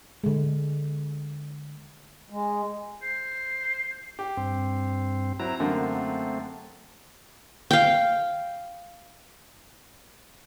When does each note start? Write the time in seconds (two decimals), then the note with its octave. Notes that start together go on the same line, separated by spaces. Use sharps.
0.24 D3 G#3
2.30 G#3
3.03 C5
4.19 G4
4.37 G2 C4
5.40 F#3 C4 E4 A#5
5.60 F#2 D3 A3 A#3 C4
7.71 F5 G5